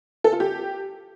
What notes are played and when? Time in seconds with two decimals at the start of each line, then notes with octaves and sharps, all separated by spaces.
0.24 A4
0.32 F4
0.40 G4